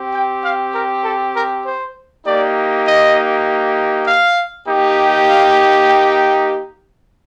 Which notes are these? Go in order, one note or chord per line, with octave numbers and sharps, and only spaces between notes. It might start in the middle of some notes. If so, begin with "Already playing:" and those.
Already playing: C4 G4
G5
F5
A#4
A4
A#4
C5
A#3 D#4 G4 D5
D#5
F5
A#3 D#4 G4
F5
G5